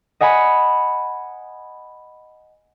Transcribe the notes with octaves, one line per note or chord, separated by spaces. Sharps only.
D#5 F#5 G#5 B5